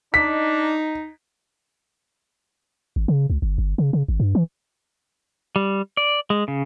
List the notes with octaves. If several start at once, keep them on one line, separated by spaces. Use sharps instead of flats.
D4 D#4 B6
G#1
C#3
C#2
G1
G1
C#3
C#3
G#1
G2
E3
G3
D5
G#3
C#3